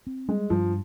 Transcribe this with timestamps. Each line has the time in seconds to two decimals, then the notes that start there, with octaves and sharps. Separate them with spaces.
0.07 C4
0.29 G3 G#3
0.50 G2 F3